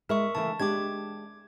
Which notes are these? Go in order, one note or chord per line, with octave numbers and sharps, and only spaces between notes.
G#3 E4 A#4 E5 C#6
C#3 E3 A3 A5
G#3 D4 G4 D6 G#6